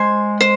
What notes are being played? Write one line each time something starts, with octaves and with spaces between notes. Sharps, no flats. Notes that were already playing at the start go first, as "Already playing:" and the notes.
Already playing: G#3 C5 G#5 C6
C5